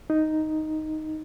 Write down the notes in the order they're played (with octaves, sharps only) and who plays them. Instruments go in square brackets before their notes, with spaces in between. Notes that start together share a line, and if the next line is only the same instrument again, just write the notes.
[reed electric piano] D#4